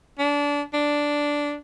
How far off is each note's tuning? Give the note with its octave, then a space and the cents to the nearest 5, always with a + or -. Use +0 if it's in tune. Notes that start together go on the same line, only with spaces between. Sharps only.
D4 -25
D4 -5